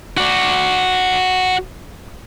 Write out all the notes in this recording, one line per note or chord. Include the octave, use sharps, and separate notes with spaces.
F#4 D5